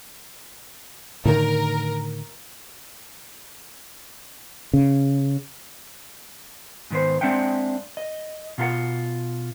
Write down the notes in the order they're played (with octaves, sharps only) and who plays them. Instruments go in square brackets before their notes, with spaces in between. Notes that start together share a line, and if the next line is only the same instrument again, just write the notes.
[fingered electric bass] A2 D3 D#3 [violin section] A#4
[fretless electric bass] C#3
[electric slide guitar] G#2 D#3 B3 C5
G#3 C4 D4 E5 F#5 G5
D#5
B2 F4 A4 F#5